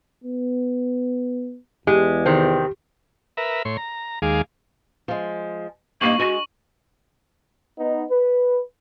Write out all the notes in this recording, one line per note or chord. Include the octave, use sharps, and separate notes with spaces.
B3
E2 G#3 G4
C3 D#3 C4
A#4 B4 E5
A2 C#5 C6
A#5
D#2 G#3 G#4 F5 D6
F3 G#3
G2 A#3 D#4 C#6 F#7
G#3 F#4
B3 D#4
B4